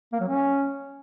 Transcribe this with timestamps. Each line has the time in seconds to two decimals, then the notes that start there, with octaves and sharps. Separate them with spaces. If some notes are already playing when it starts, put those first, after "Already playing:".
0.12 A#3
0.20 F#3
0.28 C#4